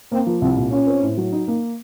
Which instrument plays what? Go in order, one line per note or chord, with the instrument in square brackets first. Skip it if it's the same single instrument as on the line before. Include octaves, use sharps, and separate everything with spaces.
[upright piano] A#3 [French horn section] C4
[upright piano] F3
[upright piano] C2 [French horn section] C4
[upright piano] A#2
[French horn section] C#4 [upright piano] F4
[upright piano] C4
A2
F#3
D#4
A#3